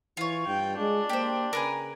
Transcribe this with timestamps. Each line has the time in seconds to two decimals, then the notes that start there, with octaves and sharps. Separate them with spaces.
0.17 E3 F4 C#5
0.47 G2 G5
0.78 G#3 D4
1.09 A#3 G4 C5
1.53 C#3 A#4 B4 G#5